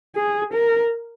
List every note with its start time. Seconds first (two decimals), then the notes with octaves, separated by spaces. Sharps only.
0.16 G#4
0.54 A#4